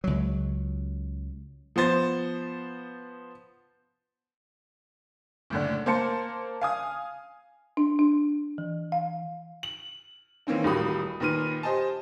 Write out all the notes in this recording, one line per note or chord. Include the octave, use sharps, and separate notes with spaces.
C#2 F#3
F3 B3 C5 A6
F#1 A2 D3
A#3 C5 A5 C#7
F5 G#5 D#6
D4
D4
E3
F5
F#7
D#3 E3 A#3 C4 C#4
D#1 A2 F#4 G4 B5 D#6
D#2 A#2 B4 F6 D#7
G4 C5 D#5 G#5 A5